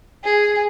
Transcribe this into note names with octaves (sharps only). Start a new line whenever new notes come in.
G#4